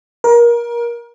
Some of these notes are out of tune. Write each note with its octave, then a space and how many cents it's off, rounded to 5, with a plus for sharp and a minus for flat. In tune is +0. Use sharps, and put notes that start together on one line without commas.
A#4 +25